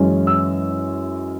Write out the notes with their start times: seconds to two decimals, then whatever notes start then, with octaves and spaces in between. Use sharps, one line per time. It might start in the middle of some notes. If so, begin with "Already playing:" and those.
Already playing: F#2 E3 G#3 C#4
0.27 E6